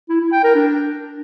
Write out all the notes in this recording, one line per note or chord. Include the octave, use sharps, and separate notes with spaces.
E4
E4
G5
A#4
D4